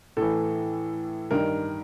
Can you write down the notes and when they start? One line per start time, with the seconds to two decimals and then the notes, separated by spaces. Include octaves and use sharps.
0.17 A2 A4
0.22 E3
1.31 G2 D#3 A#4